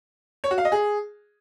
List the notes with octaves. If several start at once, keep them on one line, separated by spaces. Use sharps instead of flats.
C#5
F#4
F5
D#5
G#4